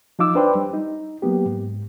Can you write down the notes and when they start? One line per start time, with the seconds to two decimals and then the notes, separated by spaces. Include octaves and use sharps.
0.19 F3 D#4 F4 D6 E6
0.35 D4 B4 C5 G5 C6
0.55 G3
0.74 D#4
1.22 F#3 A#3 B3 G4
1.46 G#2